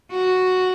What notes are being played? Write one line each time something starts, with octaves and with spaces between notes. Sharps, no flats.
F#4